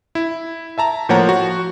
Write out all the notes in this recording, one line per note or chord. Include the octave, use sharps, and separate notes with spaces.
E4
E5 A5 A#5
A2 F3 A#3 C#5 F#5 A#5
F#4